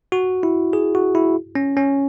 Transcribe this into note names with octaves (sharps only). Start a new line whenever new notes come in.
F#4
E4
G#4
F#4
E4
C#4
C#4